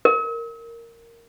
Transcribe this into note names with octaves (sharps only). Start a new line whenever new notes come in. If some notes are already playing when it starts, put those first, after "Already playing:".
A#4